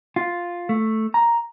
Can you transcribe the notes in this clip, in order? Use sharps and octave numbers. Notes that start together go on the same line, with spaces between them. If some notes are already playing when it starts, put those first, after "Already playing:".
F4
A3
A#5